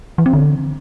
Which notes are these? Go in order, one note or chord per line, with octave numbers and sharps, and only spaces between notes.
E3
C4
D3